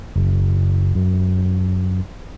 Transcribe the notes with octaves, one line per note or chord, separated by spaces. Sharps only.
F#1
F#2